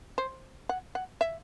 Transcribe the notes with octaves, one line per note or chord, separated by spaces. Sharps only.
C5
F#5
F#5
E5